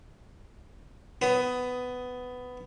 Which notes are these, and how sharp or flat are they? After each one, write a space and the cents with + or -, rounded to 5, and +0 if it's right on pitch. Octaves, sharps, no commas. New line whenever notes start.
B3 +15 D#6 +10